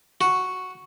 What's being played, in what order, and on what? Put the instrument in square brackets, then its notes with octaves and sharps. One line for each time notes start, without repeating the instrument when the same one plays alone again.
[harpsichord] F#4